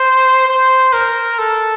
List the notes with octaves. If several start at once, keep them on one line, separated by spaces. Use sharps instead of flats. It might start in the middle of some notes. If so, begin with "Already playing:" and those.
Already playing: C5
C5
A#4
A4